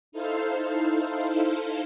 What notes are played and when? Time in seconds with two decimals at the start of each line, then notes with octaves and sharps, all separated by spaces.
0.12 D#4 E4 A4 C5 F5